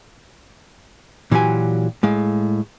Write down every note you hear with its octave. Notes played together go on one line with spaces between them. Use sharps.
A#2 E3 F#3 A#3 G4 G#5
A2 G#3 F5